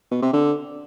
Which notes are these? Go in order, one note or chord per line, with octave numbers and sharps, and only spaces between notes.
B2
C3
D3